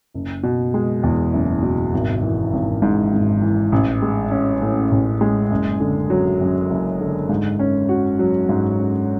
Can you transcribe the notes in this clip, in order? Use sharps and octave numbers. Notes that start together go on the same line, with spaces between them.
F#1
B2
G#3
E2
F#1
B2
G#1
E3
G#1
G#2
G#1
E3
A1
G#3
C#4
A2
A1
G#3
F#1
D3
F#3
F#2
F#1
D3
G#2
C#4
F#4
F#3
G#2
C#4